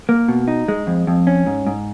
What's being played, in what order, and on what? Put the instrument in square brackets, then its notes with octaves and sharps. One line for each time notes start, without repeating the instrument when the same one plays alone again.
[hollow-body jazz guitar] A#3
B2
D#4
G#3
F2
F2
C#4
G#2
G#2